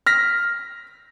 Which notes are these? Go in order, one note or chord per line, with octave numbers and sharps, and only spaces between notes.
F6 A#6 B6